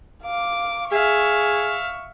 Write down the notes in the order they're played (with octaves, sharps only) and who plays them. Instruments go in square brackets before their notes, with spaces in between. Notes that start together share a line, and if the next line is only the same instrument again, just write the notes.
[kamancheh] F5 D6
[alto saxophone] G#4 [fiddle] E5 F5 [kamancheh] C#6